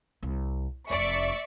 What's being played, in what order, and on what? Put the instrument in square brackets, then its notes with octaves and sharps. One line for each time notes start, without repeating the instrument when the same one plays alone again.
[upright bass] C2
[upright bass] F1 F2 [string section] D5 E5 C#6